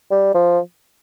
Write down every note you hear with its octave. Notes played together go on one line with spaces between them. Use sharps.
G3
F3